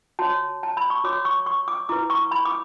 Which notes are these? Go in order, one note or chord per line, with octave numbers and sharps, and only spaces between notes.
F#4 C#5 A5
A5
B5
C#6
F#4 C#5 D6
C#6
C#6
D6
E4 B4 D6
C#6
B5
D6